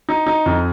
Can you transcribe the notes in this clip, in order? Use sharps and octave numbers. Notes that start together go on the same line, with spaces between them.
D#4
D#4
F2